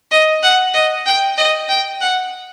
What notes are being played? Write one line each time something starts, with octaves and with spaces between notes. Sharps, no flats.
D#5
F#5
D#5
G5
D#5
G5
F#5